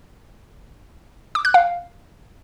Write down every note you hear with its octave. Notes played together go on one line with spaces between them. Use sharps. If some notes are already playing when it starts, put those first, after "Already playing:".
D6
F#6
F5